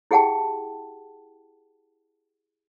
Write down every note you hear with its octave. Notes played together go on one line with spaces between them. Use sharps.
E4 G4 G#4 F#5 G5 A5